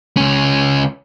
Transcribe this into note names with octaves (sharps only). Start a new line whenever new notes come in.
C#2 C#4